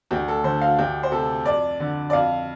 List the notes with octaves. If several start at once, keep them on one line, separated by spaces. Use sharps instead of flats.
D2 G4
A4
D3 C5
F5
D2 G4
C5
C3 A4
F2 D5
D3
D5
F2 F5